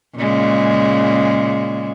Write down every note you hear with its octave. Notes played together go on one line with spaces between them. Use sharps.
A#2 C#3 G#3